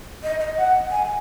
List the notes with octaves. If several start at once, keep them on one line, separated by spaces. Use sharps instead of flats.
D#5
D#5
F#5
G#5